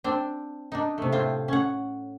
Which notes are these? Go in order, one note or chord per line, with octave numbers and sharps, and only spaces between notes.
C4 D4
D4 D#4
C3 A3
A2 C4 F4
C#4 F#5